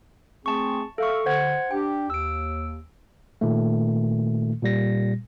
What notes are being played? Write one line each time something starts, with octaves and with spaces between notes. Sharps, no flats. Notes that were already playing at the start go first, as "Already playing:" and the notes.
A3 C4 G#4 A5 C#6
A4 E5 F5 C#6
D3 C5 F#5 G#6
D4 G4 G5
D#2 E6 D7
A#2 D#3 A3
A#2 G3 A#6